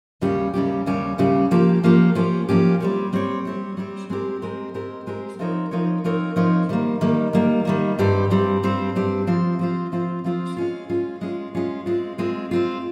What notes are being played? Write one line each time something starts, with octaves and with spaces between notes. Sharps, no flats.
D#2 C#3 G3 C#4 G4
D#2 C#3 G3 C#4 G4
D#2 C#3 G3 C#4 G4
D#2 C#3 G3 C#4 G4
F3 A#3 C#4 G4
F3 A#3 C#4 G4
F3 A#3 C#4 G4
F3 A#3 C#4 G4
G3 C4 G4 C#5
G3 C4 G4 C#5
G3 C4 G4 C#5
G3 C4 G4 C#5
G#3 C4 G4 A#4
G#3 C4 G4 A#4
G#3 C4 G4 A#4
G#3 C4 G4 A#4
F3 C4 D#4 A#4 C#5
F3 C4 D#4 A#4 C#5
F3 C4 D#4 A#4 C#5
F3 C4 D#4 A#4 C#5
D#3 G3 A#3
D#3 G3 A#3
D#3 G3 A#3
D#3 G3 A#3
G2 G3 C4 G4 C5
G2 G3 C4 G4 C5
G2 G3 C4 G4 C5
G2 G3 C4 G4 C5
F3 C4 F4 C5
F3 C4 F4 C5
F3 C4 F4 C5
F3 C4 F4 C5
G#3 C#4 F4
G#3 C#4 F4
G#3 C#4 F4
G#3 C#4 F4
G#3 C4 F4
G#3 C4 F4
G#3 C4 F4